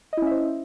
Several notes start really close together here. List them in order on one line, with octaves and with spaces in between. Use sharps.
D#5 E4 C#4 E5 C5